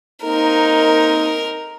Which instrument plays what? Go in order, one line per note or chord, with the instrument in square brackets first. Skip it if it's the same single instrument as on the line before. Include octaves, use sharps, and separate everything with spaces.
[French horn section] A#3 C4 D#4 [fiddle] A#4